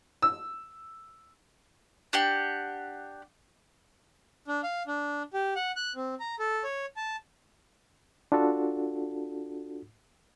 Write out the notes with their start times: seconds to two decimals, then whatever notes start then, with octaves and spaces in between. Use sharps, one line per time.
0.22 E6
2.13 D4 G4 F#5
4.48 D4
4.63 F5
4.87 D4
5.34 G4
5.56 F#5
5.76 F#6
5.96 C4
6.20 A#5
6.39 A4
6.64 C#5
6.97 A5
8.32 D4 F4 F#4 A4